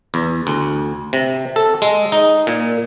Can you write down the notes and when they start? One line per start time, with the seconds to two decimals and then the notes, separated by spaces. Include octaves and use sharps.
0.14 E2
0.47 D2
1.13 C3
1.56 A4
1.82 G#3
2.12 D#4
2.47 A#2